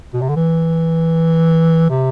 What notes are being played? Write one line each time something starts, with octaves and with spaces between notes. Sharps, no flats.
B2
C3
D3
E3
C3